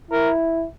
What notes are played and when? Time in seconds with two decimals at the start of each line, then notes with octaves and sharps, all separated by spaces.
0.11 E4 A#4